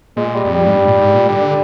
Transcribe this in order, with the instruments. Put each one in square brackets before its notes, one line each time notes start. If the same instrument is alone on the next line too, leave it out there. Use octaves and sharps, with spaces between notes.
[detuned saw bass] A#2 [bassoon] G#3
[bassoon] G3
[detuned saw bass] F2
[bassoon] G3
[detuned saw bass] G#2
G2
A#2
G2
G#2
A#2
[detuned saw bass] D3 [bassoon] G3